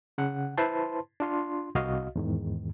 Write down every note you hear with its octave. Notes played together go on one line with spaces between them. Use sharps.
C#3 F#5
E4 B4 C5 A5 C6
D4 F4 C6
C2 F#4 D#5 F5
E2 G#2 D#3